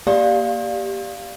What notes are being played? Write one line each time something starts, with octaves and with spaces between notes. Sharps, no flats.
A#3 G4 D5 F5